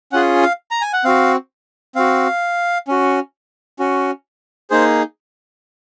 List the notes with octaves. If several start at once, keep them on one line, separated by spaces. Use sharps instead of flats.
C#4 F4 G#4 F#5
F5
A#5
G#5
F#5
C4 F#4 F5
C4 F#4 F5
C#4 F#4
C#4 F#4
A#3 D#4 G#4 C5